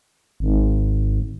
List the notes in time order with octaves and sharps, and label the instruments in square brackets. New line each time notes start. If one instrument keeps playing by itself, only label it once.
[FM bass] G#1